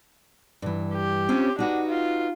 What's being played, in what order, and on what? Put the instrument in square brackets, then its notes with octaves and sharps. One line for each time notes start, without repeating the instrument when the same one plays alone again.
[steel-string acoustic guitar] G2 E3
[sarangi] G4
[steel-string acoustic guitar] C4 C#4 F4
[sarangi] D4 [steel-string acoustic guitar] D#4 F#4 B4
[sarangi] F4